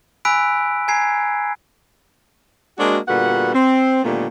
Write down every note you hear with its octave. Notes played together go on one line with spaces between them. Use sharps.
G#5 B5 E6 F#6 B6 D7
G#5 A#5 G#6 C7
G#3 A#3 C4 D4 F#4
A#2 D3 G3 B3 F#4 F#5
C4
A#2 D3 D#3 G3 A3 B3